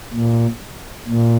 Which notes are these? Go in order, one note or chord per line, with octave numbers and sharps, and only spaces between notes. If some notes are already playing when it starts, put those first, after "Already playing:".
A#2
A#2